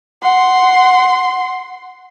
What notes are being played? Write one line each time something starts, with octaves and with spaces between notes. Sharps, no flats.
F#5 C6